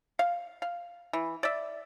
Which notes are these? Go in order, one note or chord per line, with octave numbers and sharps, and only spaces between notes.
F5
F5
E3
D5 E5